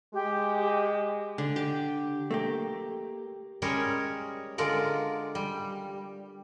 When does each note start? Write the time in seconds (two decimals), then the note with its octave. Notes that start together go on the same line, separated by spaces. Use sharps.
0.14 G#3 G4
1.38 D3
1.56 G4
2.31 A3 A#3 G4
3.62 G3 G#3 C#4 G#4 A#4 C#5
4.58 D3 G#3 F4 A#4 D5
5.35 G3